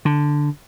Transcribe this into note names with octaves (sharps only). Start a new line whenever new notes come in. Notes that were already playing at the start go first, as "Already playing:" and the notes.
D3